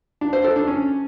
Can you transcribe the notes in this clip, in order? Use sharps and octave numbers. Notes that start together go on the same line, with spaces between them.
D4
C5
A4
D4
C#4